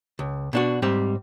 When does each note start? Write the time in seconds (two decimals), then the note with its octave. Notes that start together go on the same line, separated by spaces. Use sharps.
0.19 C#2
0.53 B2 D4 F#4
0.82 G#2 G3 C4 G4